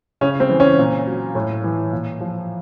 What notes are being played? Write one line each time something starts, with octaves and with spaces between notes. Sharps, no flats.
C#3 C#4
C4
E3
C#4
A#2
F#3
A2
E3
A#2
F3